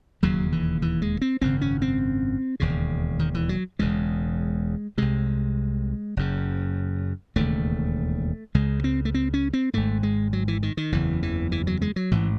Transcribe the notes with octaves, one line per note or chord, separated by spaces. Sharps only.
E1 D#2 C#3 F#3
E3
E3
G#3
C4
G#1 F#2 C#3 C4
C#4
C4
E1 D#2 C#3
D#3
E3
F#3
E1 E2 C#3 G#3
C2 C3 G#3
F#1 F#2 C#3
E1 D#2 C#3 A3
C#2 C#3 G#3
C4
A3
C4
C#4
C4
G#1 G#2 A3
G#3
F#3
E3
D#3
D#3
F#1 E2 C#3 E3
E3
E3
F#3
G#3
F#3
A1 G#2 E3